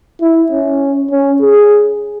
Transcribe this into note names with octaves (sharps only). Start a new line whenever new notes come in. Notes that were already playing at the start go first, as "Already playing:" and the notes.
E4
C#4
C#4
G#4